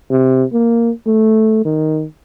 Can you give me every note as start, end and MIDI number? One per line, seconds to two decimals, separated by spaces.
0.11 0.44 48
0.53 0.91 58
1.07 1.62 57
1.65 2.05 51